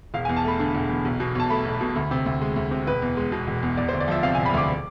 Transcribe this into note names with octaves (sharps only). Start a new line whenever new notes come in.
E1 F5
E2 G#5
A5
A3 B5
D3
E1
E2
B1
B2
B1 A5
A3 B5
B1
B2
D2
C3
D2
G#3
D2
C3
E1 B4
E2
G#3
B2
E1
E2
E1 D5
D2 C5
D5
F3 E5
C3 F5
E1 G#5
B5
D2 D6